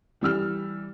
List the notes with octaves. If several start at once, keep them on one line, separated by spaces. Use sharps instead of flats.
E3 G3 E6 F6